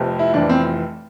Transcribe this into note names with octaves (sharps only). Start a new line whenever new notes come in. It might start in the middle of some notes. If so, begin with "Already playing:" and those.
Already playing: F1 F2 C3
E4
F1 F2 E3 D4
C4